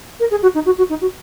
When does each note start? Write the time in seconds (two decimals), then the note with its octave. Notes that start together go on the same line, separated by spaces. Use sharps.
0.20 A#4
0.31 G#4
0.42 F#4
0.55 D#4
0.66 F#4
0.78 F#4
0.90 D#4
1.01 F#4